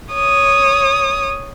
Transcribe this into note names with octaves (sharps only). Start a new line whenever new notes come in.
C#5 D#6